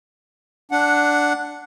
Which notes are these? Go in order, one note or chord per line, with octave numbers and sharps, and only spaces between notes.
D4 F#5